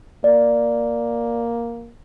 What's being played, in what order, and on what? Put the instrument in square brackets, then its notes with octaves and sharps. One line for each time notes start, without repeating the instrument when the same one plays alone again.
[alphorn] A#3 [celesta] D5